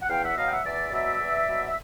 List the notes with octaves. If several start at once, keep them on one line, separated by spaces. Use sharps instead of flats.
F#5
E2 F5 G5
E5 F#5
B2 F#3 D#5 F5
G5
E5 F#5
E2 D5 E5
B2 F#3 D5 E5
E2
B2 F#3
E5